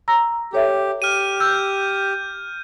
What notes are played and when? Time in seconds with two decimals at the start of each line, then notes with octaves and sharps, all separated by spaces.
0.08 A#5 E6 A#6
0.53 G4 A4 C#5 E5
1.02 G4 F6 D#7
1.40 E6 G6